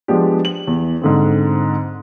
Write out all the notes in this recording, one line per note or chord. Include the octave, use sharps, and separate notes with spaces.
F3 G#3 B3 D4 G4
F#7
E2
G#2 D3 C4